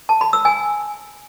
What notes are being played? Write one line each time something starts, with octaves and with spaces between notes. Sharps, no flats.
A5
B5
E6
G#5